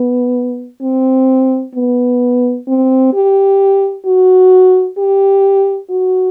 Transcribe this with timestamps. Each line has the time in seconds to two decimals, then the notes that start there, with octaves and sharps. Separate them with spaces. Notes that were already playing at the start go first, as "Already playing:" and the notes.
Already playing: B3
0.82 C4
1.75 B3
2.68 C4
3.13 G4
4.06 F#4
4.98 G4
5.90 F#4